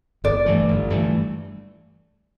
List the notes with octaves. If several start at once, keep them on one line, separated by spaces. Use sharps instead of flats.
G1 D5
G2 E3 A3
G1
G2 E3 A3